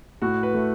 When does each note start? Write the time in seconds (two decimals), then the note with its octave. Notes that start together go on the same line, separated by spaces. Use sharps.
0.22 A2 F#4
0.43 B4
0.54 A3